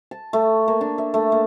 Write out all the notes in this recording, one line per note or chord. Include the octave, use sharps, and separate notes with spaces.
A5
A3
A#3
D4
E5
A3
A#3